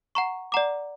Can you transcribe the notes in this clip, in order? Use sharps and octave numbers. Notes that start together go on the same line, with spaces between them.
F#5 A#5 C#6
D5 F#5 A#5 D6